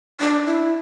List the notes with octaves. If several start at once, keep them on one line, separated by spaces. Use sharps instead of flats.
D4
E4